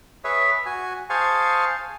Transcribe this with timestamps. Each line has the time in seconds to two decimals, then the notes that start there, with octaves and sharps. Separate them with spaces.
0.24 G#4 B4 C#5 E5
0.66 F#4 G#5
1.10 G#4 C5 F5 G#5 A5 C#6